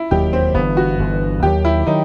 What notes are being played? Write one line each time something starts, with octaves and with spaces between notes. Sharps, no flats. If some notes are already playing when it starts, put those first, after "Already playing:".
Already playing: E4
E1 D#2 D#3 F#3 G4
C4
G1 G2 E3 B3
F#4
G1 G2 E3
D#2 D#3 F#3 G4
E4
D#3 F#3 D#4